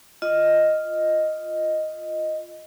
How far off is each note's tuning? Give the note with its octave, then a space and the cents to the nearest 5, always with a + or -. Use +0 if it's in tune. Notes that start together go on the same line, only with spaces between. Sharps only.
F4 +0 D#5 +0